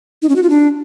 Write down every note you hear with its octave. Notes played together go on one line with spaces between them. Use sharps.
D#4
C#4
F#4
F4
D4